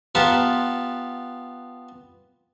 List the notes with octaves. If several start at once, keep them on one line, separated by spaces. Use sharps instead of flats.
B3 F4 G4 F#5 A5 A#5